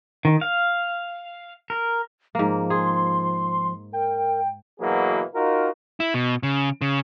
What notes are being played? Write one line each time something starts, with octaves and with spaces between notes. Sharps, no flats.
D#3
F5
A#4
G#2 F3 A#3
G#4 C6
A#4 G5
B2 E3 F#3 A#3 G#4
D#4 F4 F#4 A#4
E4
B2
C#3
C#3